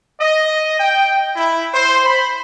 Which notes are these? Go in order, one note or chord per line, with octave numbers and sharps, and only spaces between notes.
D#5
G5
E4
C5
B5